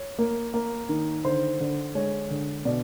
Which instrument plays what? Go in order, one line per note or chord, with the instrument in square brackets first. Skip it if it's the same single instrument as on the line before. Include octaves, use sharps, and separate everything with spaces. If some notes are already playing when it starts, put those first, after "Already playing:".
Already playing: [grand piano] C#5
A#3
A#3
D#3
D3 C5
D3
G#3 C#5
D3
B2 D5